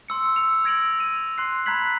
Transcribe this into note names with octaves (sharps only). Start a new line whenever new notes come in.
C6 E6 C#7
E6 C#7 F7
E6 G#6 A#6 D7 F7 F#7
D#7 F7
C6 F#6 C7
A#5 B5 F#6 G#6 B6 F#7